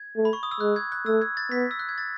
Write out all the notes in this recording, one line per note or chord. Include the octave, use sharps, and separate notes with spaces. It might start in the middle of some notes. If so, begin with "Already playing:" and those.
Already playing: G#6
A3
B5
C#6
D#6
E6
G#3 F#6
G#6
F#6
A3 E6
G#6
A6
B3 B6
E6
F#6
G#6
A6